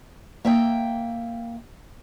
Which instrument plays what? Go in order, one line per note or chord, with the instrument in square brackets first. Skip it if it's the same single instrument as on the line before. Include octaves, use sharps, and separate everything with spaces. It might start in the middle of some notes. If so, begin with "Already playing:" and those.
[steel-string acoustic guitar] A#3 E5 G5